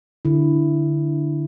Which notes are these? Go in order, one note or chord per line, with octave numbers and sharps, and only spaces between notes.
D3 E4